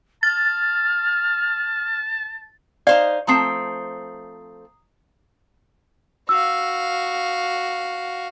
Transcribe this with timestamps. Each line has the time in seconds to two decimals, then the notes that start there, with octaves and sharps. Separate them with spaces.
0.23 A5 F6 A6
2.87 D#4 C5 D5 F5
3.27 F3 A3 C4 A#5 D#6 C7
6.29 F#4 F5 E6